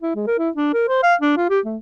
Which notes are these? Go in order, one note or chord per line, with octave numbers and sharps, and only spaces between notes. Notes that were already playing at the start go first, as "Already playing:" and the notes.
E4
G#3
A#4
E4
D4
A#4
C5
F5
D4
F4
G4
A3